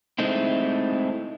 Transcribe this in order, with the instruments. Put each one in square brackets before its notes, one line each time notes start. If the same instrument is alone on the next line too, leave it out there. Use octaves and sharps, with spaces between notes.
[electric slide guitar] G#3 A3 C4 D#4 E4